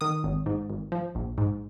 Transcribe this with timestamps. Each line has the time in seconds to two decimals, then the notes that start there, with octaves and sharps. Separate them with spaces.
0.01 D#3 D#6
0.24 G#1
0.46 G#2
0.70 G#1
0.92 F3
1.15 A#1
1.38 G#2